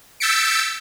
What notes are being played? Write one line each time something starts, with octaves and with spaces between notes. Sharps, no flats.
E6 G6 A6 B6 C#7 D7